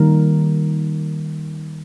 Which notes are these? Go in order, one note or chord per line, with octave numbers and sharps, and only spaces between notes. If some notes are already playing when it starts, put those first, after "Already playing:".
Already playing: D#3 G3 A#3 A#4